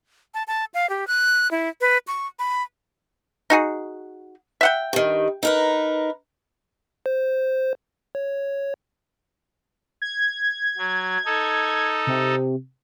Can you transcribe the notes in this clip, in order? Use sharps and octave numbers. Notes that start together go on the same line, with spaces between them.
A5
A5
F5
G4
F#6
E4
B4
C#6
B5
D#4 F#4 G#4
E5 F#5 G5
G2 D#3
D#4 A#4 B4
C5
C#5
G#6
F#3
D#4 A4
C3